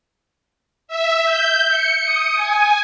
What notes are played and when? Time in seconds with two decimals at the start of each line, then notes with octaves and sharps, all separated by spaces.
0.88 E5
1.25 G6
1.69 C#7
2.04 D#6
2.35 G#5